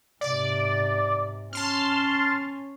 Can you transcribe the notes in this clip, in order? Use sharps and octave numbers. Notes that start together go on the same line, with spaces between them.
G#2 C3 D5
C#4 A5 C6 F6